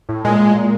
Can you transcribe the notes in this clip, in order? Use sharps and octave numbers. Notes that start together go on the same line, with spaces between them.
A2
A#2 G#3
A#2
A#2